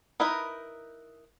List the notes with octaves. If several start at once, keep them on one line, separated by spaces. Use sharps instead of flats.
D#4 E4 A#4 B4 D#5